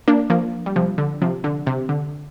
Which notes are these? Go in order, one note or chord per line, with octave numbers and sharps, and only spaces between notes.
A#3 D4
F3 A#3
G3
C3 F3
D3
C3 F3
D3
C3
D3